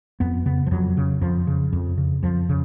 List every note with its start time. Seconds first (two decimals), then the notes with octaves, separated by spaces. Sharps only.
0.20 F2 B3
0.46 C#3 B3
0.67 F3
0.71 F2 F#3
0.97 C#3
1.21 F2 F3
1.47 C#3
1.73 F2
1.98 C#3
2.23 F2 F3
2.49 C#3